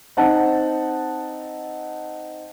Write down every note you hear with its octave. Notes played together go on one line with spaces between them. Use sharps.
C4 D#4 F#5 A5